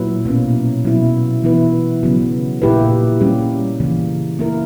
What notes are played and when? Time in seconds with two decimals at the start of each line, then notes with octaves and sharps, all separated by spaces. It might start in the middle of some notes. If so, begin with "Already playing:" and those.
Already playing: A#2 F#3 E4 B4
0.25 B2 A#3 C#4
0.85 B2 F#3 B3 E4
1.43 E3 B3 E4 B4
2.03 C#3 F#3 B3
2.62 A#2 A#3 E4 G4 B4
3.21 G3 A#3 C#4 G4
3.80 C#3 E3 A#3
4.39 A#3 E4 A#4